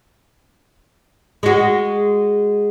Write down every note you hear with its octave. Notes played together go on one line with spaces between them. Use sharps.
G#3 F#4